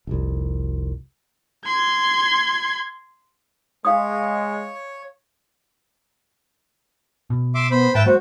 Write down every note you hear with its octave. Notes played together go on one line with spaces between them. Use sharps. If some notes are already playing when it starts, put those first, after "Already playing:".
F1 C2
C6 G#6
G#3 C#5 F5 D#6
B2
E5 C6 D6
B3 C5 B5
G#2 B4 E5 G5 A5
F#3 G#3 A#3 F#4 C5